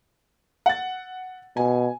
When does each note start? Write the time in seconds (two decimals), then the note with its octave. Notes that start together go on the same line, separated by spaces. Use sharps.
0.66 F#5 A6
1.57 B2 G#5